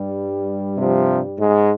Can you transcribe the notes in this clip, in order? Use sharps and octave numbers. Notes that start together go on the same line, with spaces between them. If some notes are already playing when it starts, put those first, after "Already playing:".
Already playing: G2 G3
C3 F3
G#2 G#3